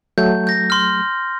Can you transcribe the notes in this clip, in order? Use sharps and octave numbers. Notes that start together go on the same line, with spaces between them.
F#3 A3 G6
G6 A#6
C6 F6